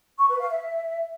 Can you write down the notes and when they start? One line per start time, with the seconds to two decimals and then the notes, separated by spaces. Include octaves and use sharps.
0.19 C#6
0.29 B4
0.40 F5
0.50 E5